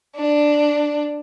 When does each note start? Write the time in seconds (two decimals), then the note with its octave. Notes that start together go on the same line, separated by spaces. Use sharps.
0.16 D4